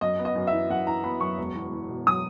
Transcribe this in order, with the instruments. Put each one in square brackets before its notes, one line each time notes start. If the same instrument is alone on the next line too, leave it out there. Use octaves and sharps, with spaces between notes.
[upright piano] F#2 D#5
B3
D#5
F#2
E5
E3
F#2 F#5
E3 A#5
B3 B5
F#2 C#6
E1
E2
E2
B2
F#3 D#6